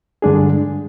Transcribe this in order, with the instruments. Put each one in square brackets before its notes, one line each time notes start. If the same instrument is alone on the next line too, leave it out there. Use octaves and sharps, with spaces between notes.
[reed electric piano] G2 D3 G#3 D4 G#4